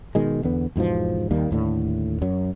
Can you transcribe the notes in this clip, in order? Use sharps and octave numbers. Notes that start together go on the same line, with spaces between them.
B2 D#3 G#3
E2 D3 B3
E2 G#2 B2 F3
D#2 D#3 G3 A#3
D#2 A2 D3
F#2 F#3